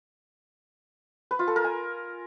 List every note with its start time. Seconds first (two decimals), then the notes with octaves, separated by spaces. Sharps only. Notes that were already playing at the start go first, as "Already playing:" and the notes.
1.31 B4
1.39 F4
1.48 A4
1.56 A#4
1.64 G#5